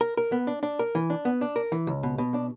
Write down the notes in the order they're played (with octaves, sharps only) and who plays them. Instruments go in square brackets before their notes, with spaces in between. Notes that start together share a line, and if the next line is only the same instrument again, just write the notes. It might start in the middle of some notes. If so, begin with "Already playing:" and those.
[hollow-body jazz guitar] A#4
A#4
B3
D4
D4
A#4
E3
D4
B3
D4
A#4
E3
C#2
B2
B2
D4